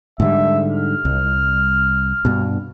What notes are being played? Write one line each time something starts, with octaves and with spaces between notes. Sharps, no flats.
G#2 D3 G3 E5
F6
C2
G2 B2